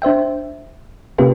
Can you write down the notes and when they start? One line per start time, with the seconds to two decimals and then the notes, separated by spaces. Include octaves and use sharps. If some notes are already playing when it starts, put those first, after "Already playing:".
0.02 D4 C5 E5 G5
1.18 C3 A#3 C#4 F4 G4 B4